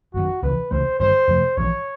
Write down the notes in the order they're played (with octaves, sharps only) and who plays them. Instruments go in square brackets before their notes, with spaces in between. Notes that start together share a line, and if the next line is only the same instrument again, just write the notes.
[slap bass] G1 F#2 D#3 [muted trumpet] F#4
[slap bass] C#2 C3 E3 [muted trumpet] B4
[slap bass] C#2 C3 E3 A3 [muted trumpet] C5
[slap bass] G1 G2 D#3 G3 [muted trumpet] C5
[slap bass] F2 C3 F3 A3
[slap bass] A#1 G#2 E3 [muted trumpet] C#5